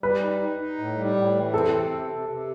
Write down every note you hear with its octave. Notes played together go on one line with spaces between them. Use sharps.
G3 B4
D#4
D#4
D#4
A2
G3
A2
E3
C4 A4
C3
C3
C3
C3